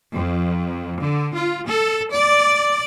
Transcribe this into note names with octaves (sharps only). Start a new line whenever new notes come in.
F2
D3
F4
A4
D5